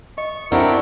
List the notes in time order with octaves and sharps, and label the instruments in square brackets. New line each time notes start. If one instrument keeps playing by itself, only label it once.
[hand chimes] D#5 [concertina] C#6
[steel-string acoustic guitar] C4 D4 G4 [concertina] E4 A#4 [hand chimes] F#5 C#6